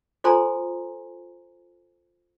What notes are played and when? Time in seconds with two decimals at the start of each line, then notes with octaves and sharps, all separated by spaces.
0.24 F4 A4 C5 G#5 A#5 C6